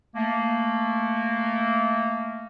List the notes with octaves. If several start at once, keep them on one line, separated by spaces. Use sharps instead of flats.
A3 A#3